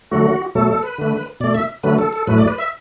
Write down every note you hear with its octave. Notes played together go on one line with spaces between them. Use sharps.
D3 F#3 A3 F#4
B2 F#3 A3 A4
A4
B4
D3 A3
B2 A3 D5
E5
D3 F#3 A3 B4
A4
A4
A2 F#3 A3 B4
D5
B4
E5